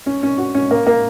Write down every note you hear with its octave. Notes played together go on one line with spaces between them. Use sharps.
C#4
C#4
F#4
C#4
A#3
A#3